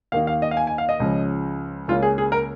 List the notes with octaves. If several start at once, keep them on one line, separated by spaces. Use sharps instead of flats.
D#2 D#3 A#3 D#4 F5
F5
D#5
F5
G#5
G#5
F5
D#5
C#2 C#3 F3 C#4
C#2 C#3 A#3 C#4 F4
G#4
G#4
A#4